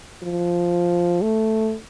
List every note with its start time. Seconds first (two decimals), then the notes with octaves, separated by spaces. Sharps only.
0.23 F3
1.23 A3